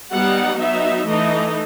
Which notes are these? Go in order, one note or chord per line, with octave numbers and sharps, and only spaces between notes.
G3 B3 D#4 F#5
F#3 B3 D#4 E5
E3 A3 D#4 D#5